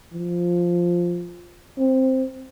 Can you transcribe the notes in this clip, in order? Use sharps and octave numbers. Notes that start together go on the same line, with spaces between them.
F3
C4